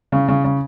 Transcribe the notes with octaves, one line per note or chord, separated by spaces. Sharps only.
C#3
C#3
C#3